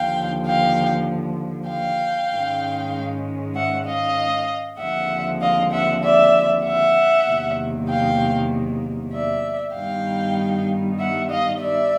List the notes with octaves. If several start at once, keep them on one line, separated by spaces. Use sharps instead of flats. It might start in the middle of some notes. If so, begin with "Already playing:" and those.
Already playing: D#2 D3 F3 F5 G5
F5 G5
F5 G5
G#2 D#3 G#3 C#4
E5 F#5
D#5 F5
D#2 D3 F3 G#3 C4 E5 F#5
D#5 F5
E5 F#5
D5 E5
E5 F#5
E2 C3 D#3 F#3 A#3
F5 G5
D5 E5
G2 D#3 G3 B3 D#4 F5 G5
E5 F#5
D#5 F5
D5 E5